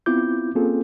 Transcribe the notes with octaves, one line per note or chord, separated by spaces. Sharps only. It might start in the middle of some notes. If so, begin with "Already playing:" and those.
B3 C4 E4 F4 D6 G6
A#3 C4 C#4 F4 G#4 A4